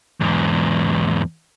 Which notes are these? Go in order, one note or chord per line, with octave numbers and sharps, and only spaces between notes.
E2 G#2